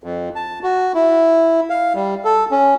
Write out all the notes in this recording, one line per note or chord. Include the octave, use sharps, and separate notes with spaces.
F2
A5
F#4
E4
F5
G3
A4
C#4